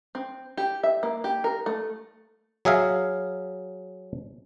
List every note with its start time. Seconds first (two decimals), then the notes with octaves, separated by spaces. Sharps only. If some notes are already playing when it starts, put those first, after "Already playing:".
0.15 C4
0.57 G4
0.83 E5
1.03 A#3
1.24 G4
1.44 A#4
1.66 A3
2.65 F#3 G#4 E5 F5